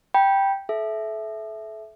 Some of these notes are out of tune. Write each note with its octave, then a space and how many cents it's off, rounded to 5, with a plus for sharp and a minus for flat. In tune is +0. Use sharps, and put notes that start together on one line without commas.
G5 +0 B5 -25
A4 -35 E5 +0